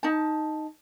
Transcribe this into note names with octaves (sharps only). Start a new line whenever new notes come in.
D#4 A5